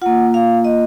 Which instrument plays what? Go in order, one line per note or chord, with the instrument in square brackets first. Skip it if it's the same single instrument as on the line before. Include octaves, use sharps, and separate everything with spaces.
[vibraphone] A#3 F4 F#5
F5
D#5